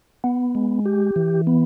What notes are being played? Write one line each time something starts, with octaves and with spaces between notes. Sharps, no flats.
B3
G#3
G4
E3
B3